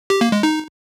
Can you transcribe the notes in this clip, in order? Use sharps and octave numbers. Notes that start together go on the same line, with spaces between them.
G4
A#3
G#3
D#4